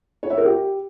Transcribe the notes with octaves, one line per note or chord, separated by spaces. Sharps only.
C#5
E5
A#4
G4